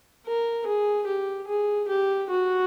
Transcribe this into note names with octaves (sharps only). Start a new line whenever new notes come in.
A#4
G#4
G4
G#4
G4
F#4